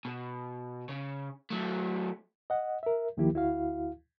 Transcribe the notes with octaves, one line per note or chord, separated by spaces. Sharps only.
B2
C#3
F#3 A3
D#5 F#5
A#4 E5
D2 D#3 F3 A#3 E4 G4
D2 E4 F#4 F5